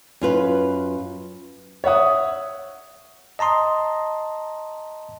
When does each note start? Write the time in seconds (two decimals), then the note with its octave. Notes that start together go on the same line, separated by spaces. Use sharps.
0.21 F#2 F4 B4
1.84 C#5 E5 F#5 D#6
3.39 D#5 A5 A#5 C6 D#6